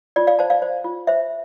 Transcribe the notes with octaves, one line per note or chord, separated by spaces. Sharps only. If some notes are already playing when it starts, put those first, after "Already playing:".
F4 D5
D5 F5
C5 F5 A5
D5 F5
C5
F4
C5 E5